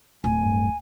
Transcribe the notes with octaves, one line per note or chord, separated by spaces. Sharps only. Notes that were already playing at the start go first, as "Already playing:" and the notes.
D1 G#5
G2